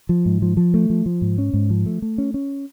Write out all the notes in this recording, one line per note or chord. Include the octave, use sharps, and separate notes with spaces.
F3
G#2
F3
F3
A3
F3
F3
G#2
C#4
G#2
F3
A3
A3
C#4
C#4